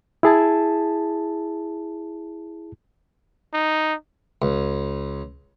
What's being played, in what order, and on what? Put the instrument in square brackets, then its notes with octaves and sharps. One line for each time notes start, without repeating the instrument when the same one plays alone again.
[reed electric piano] E4 G#4 A5
[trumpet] D#4
[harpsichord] C#2